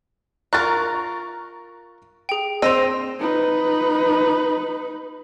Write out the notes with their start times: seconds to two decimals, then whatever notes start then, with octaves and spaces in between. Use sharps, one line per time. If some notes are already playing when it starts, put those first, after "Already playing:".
0.53 F4 A#4 A#5 C#6 F#6 A6
2.29 G#4 G5
2.62 C4 C5 D#5 E6 A#6 F7
3.20 D#4 B4